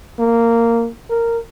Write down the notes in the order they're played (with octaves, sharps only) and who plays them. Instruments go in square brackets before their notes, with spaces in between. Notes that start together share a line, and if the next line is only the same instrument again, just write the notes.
[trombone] A#3
A#4